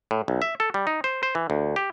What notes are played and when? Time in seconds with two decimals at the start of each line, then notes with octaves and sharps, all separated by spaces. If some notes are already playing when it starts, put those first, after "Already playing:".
0.11 A2
0.28 B1
0.42 E5
0.60 A4
0.74 G3
0.87 D#4
1.04 C5
1.23 C5
1.35 E3
1.50 D2
1.76 G4